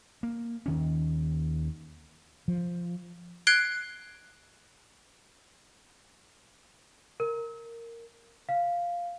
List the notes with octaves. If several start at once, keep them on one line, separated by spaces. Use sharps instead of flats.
A#3
D#2 D#3 C#4
F3
F#6 G#6 C7 D7 G7
A#4
F5